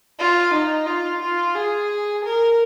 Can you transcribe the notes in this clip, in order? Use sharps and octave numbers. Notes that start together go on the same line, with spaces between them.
F4
D#4
F4
F4
G#4
A#4